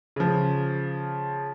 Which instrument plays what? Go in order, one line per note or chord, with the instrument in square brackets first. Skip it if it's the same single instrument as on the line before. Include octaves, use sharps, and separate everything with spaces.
[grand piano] C#3 F3